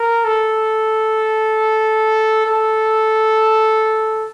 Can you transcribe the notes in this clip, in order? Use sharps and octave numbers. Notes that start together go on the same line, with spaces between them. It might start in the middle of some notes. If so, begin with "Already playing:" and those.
Already playing: A#4
A4
A4